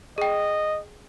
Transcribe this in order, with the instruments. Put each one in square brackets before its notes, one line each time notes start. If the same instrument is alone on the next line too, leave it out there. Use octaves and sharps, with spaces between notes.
[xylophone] G#4 G5 [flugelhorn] D#5